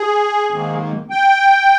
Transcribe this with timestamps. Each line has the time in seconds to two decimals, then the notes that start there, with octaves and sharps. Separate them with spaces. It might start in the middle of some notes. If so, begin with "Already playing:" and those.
Already playing: G#4
0.50 G#2 D#3 A#3
1.10 G5